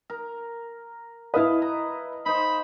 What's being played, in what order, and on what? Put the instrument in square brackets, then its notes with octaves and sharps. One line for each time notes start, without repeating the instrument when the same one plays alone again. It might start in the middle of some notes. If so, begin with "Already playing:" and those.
[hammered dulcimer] A#4
[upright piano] E4 B4 [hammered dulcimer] D#5 F5 A5
[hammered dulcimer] A#5
[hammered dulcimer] D#4 C5 [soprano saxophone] B5